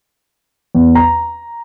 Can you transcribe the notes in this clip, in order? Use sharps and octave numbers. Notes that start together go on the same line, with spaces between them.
E2
A#5